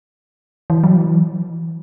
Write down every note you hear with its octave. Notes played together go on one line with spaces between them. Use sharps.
E3
F#3
E3